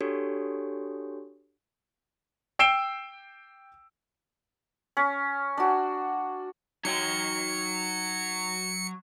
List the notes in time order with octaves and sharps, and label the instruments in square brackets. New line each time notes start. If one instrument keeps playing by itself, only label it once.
[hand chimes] D4 F#4 G4 A4 C#5
[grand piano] G5 E6 C7 D7 E7 G7
[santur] C#4
D4 F#4
[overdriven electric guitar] F#3 F#4 [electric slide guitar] D#4 C#5 G5 [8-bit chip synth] C#7